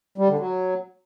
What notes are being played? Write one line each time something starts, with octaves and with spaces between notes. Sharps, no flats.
G3
D3
F#3